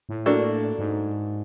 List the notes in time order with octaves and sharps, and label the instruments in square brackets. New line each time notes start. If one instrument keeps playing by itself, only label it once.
[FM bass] A2
[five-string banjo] A#3 D4 F#4 A4
[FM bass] G#2